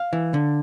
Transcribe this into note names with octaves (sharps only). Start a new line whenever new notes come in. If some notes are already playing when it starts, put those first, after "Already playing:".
Already playing: F5
E3
D3